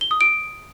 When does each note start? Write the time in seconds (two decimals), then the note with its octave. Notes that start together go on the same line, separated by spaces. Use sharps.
0.01 G7
0.11 D#6
0.21 D7